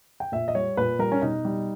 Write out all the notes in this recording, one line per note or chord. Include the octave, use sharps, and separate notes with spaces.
G5
A#2 E5
D#5
G3 C#5
A#2 B4
G3 A#4
C#4
B2 D#4
G3